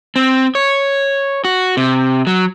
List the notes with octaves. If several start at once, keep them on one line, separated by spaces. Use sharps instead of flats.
C4
C#5
F#4
C3
F#3